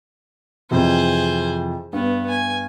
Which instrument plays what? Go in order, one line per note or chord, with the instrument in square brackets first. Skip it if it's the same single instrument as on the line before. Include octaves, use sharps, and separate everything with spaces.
[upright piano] F2 C3 E3 [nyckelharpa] G#4 C5
[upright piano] G2 [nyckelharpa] B3
[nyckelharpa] G#5